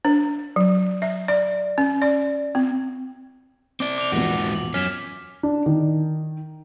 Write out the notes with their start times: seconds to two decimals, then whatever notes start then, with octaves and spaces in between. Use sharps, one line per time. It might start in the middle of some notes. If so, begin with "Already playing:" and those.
0.05 D4
0.56 F#3
1.02 E5
1.28 D5
1.78 C#4
2.02 D5
2.55 C4
3.80 C4 D5 D6
3.98 D6 F7
4.12 E1 A#1 G#2 B3 F#4
4.55 F#7
4.74 F#2 C#4 F6 B6 E7
5.43 D4
5.66 D#3